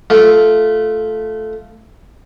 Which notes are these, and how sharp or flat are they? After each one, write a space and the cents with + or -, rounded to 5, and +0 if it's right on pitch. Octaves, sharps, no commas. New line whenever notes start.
A3 -10 F4 +0